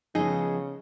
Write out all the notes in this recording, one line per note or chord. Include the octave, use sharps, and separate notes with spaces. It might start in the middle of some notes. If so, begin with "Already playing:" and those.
C#3 F3 G#3 B3 D#4 G#4 A4 D#5